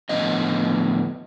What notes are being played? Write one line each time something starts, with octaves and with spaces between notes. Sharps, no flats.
A2 D3 F3 B3 C4 D#5